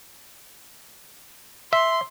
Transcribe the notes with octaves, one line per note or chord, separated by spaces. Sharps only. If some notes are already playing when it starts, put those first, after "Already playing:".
E5 C6